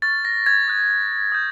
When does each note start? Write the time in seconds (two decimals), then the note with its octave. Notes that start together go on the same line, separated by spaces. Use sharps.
0.02 C#6 F6 A6
0.25 A#6
0.46 G#6
0.68 D#6 F#6
1.32 D#6 G6